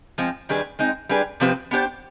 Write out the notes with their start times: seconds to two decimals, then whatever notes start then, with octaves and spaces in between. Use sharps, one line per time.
0.18 F3 G#3 C4
0.49 D#3 G3 D4 G#4 B4
0.79 G#3 C4 D#4
1.09 G3 D4 G#4 B4
1.40 C3 F3 C4 G4 B4
1.71 B3 D4 G4 C5